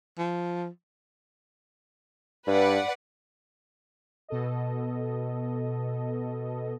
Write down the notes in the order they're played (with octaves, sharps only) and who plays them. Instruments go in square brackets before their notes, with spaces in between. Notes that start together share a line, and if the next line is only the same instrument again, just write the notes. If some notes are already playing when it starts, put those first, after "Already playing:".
[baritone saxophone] F3
[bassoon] G2 [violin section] B4 D5 F#5
[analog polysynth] B2 A4 D#5